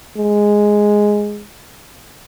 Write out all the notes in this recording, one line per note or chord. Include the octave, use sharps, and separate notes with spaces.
G#3